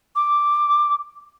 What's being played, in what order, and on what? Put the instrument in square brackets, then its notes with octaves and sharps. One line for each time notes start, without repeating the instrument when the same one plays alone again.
[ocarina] D6